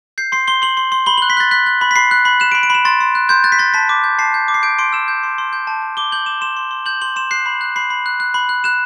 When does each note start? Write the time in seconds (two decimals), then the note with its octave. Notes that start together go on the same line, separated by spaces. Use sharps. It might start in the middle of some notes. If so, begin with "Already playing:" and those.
0.18 G6 C7
0.32 C6 C7
0.48 C6 G7
0.62 C6 F#7
0.77 C6
0.92 C6
1.06 B5 G7
1.18 F#6 F#7
1.30 B6
1.37 F#6 A6
1.51 F#6 B6
1.66 F#6
1.81 B5
1.91 B6
1.96 B5 C7
2.11 F#6
2.25 B5
2.40 F#6 E7
2.52 D7
2.55 B5
2.63 D7
2.70 B5 E7
2.85 C6 A6
3.01 C6
3.15 F#6
3.29 C6 G6
3.44 F#6 A6
3.52 B6
3.59 C6 A6
3.74 A5 B6
3.89 D6
4.04 G6
4.19 A5 C7
4.34 G6
4.48 D6
4.54 C7
4.63 G6 D7
4.79 C6 D7
4.93 E6 E7
5.08 G6
5.23 C6
5.38 C6
5.53 G6
5.67 A5
5.82 A5
5.97 D6 G7
6.12 G6 F#7
6.26 D6 E7
6.41 C6 E7
6.57 C6
6.71 C6
6.86 G6 F#7
7.01 C6 F#7
7.16 C6 E7
7.31 F#6 C7
7.46 B5
7.61 F#6
7.76 B5 C7
7.90 B5
8.06 F#6
8.20 F#6
8.34 B5
8.49 F#6
8.64 F#6 E7